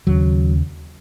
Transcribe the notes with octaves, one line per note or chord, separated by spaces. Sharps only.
D#2 C#3 F#3